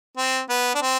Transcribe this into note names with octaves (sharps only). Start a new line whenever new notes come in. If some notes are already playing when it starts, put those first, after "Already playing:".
C4
B3
D4
C4